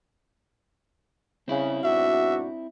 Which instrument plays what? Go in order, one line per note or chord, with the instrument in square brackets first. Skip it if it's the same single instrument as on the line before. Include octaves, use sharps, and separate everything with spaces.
[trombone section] C#3 [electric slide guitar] C4 E4
[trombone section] G#2 B2 D4 [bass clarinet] F#4 [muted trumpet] E5